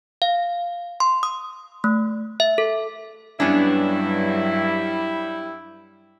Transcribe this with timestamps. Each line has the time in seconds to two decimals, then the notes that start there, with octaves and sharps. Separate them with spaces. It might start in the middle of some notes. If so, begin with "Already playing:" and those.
0.22 F5
1.00 C6
1.23 D#6
1.84 A3
2.40 E5
2.58 A4
3.40 G2 F#3 G3 B3 C#4 D4 E4